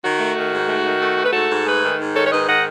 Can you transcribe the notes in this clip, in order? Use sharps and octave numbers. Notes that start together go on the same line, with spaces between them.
D#3 F#4
A3
D#3
G#2
A3
D#3
A3
A3
B4
G#2 F#4 A4
G#2
A3 G#4 B4
D#3
G#2
D#3 A4 C#5
C#5
G#2 B4 D#5
D#3 D#5 F#5